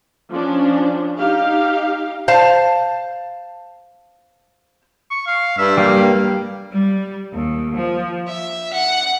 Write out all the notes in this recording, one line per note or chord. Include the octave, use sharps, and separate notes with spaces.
F3 C#4 D4
D#4 G4 F5
C5 F5 A5
C#6
F5
G2 E5
G3 A#3 F5
G3
D#2
F3
E5
F#5